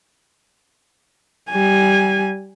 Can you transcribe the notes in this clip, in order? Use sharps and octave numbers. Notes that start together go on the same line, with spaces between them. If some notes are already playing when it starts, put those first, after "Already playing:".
G3 G#5